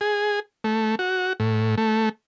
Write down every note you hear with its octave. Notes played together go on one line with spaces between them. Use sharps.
G#4
A3
F#4
A2
A3